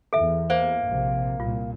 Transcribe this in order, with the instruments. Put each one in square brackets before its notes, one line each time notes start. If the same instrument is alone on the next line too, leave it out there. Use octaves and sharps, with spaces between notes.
[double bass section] E2 [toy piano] A4 E5
[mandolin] A#3 [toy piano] C5
[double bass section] A#1 C3
[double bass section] C2 A#2 [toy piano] F4